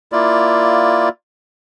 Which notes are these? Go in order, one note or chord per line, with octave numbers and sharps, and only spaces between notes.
A#3 E4 F4 D5